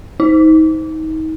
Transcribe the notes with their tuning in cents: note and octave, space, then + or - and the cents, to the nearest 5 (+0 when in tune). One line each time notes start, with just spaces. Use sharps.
D#4 +30